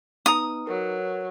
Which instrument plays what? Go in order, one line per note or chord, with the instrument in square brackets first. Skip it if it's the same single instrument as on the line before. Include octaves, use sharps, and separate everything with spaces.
[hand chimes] B3 B4 [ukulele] D#4 A#5 [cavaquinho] D#6
[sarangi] F#3 [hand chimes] A#4 B4 C#5